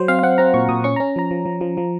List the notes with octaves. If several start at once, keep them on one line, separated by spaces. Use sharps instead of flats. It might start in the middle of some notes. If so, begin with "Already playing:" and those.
Already playing: F#3 C5
C4 F5
F5
C4 F#5
C4 A#5
A#2 C#6
A#2 D#6
C#4 C#6
C#4 A#5
F3 A#5
F3
F3
F3
F3